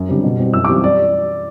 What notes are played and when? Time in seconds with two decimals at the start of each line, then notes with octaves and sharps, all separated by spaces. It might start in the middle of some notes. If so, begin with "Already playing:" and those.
Already playing: F#2
0.09 D3 G3 C4
0.24 B2
0.39 G3 C4
0.54 F#2 E6
0.65 D6
0.69 E3 G3 C4
0.84 D5